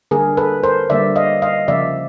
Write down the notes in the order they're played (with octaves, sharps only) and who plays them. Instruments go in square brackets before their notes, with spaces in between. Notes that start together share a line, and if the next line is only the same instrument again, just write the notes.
[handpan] D3 G3 A#3 G#4 A#4
A4 B4
A#4 C5
D3 G3 A#3 D5 E5
D#5 F5
D#5 F5
C#3 F3 A#3 D5 E5